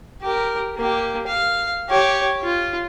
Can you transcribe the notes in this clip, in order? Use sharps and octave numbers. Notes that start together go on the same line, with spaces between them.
G4 A#4
A#3 G4
F5
G4 C#5
F4